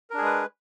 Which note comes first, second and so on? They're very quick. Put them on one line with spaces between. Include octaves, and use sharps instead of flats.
A#4 D4 G#4 G#3 B4